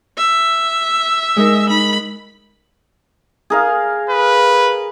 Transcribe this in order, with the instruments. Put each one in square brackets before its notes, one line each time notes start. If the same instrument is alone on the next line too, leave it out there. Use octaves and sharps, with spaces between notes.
[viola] E5
[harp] G#3 D#4 A#4
[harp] D#4 [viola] B5
[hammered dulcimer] G#4 A#4 F5
[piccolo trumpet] B4